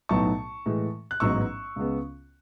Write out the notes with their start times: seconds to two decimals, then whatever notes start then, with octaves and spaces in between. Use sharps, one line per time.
0.09 B1 A2 F#3 B3 D#4 A5 C#6
0.66 A2 E3 G#3
1.11 F#6
1.20 A1 G#2 F#3 B3 D#4 C#6 E6
1.76 C#2 C#3 G#3 B3